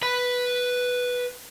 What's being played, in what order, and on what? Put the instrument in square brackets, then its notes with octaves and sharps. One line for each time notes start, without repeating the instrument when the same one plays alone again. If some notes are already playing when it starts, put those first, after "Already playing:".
[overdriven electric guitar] B4 B5